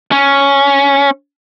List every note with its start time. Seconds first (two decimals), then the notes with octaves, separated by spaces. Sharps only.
0.12 C#4